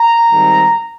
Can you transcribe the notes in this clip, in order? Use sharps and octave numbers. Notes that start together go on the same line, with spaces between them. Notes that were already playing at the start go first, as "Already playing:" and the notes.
Already playing: A#5
G#2 D#3 G3 C4